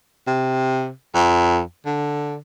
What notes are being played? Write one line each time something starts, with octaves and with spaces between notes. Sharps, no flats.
C3
F2
D3